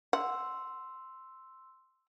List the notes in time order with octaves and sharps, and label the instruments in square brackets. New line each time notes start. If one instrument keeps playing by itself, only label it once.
[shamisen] F#5 [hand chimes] C6 E6